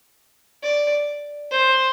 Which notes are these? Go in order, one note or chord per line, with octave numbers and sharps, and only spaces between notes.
D5
C5